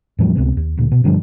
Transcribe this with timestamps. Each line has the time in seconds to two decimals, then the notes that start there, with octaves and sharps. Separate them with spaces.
0.19 E2 A2 F3 G3
0.36 C#2 C3 B3
0.57 D#2
0.77 D2 A#2
0.92 B2
1.04 G2 D3 F3 G3